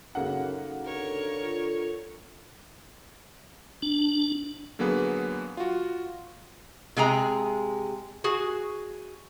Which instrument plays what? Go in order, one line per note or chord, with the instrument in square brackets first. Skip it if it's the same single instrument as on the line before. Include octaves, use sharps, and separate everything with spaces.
[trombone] F#2 [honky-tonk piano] C#3 A#3 F#5 [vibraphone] D#4 F#4 A4
[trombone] D3 [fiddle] A#4 C#5
[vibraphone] F4 A4
[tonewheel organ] D4
[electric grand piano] D3 F#3 A#3 B3 G#4 B4
F4 F#4
[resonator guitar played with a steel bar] C3 G#3 G#4 A#5
F#4 G#4